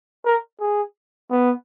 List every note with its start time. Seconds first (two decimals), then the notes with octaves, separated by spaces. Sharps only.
0.25 A#4
0.60 G#4
1.31 B3